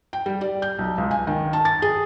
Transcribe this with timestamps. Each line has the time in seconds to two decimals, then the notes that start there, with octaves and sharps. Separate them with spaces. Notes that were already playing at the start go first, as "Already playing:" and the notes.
0.13 G5
0.26 G3
0.41 D5
0.62 G6
0.79 B1
0.98 C#2
1.11 G#5
1.27 D#3
1.53 A5
1.65 A6
1.82 G#4